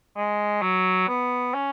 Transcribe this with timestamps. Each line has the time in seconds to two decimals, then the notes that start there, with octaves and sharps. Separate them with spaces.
0.16 G#3
0.62 F#3
1.09 B3
1.54 C#4